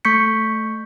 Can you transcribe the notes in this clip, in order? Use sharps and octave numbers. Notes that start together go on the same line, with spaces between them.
A3 C#6 G6 B6 C#7